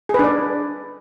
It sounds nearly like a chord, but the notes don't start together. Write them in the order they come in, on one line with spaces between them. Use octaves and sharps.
G#4 B4 D4 D5